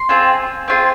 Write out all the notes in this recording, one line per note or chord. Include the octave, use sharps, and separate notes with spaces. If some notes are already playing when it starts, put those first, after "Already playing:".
Already playing: C6
C4 F4 G#4
C4 F4 G#4